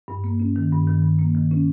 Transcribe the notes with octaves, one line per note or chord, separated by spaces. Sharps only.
G2
A#3
C#4
D#3
G2
D#3
G2
A#3
D#3
C#4